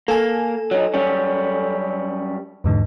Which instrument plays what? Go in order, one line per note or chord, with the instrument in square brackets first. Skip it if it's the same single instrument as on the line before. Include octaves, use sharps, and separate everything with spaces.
[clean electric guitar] A#3 [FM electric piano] A4 G#5
[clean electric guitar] F#3 D#4
F#2 G3 C#4
[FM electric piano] E2 G#2 D3